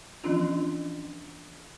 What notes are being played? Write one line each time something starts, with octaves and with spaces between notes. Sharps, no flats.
E3 F3 B3 C#4 D4 F4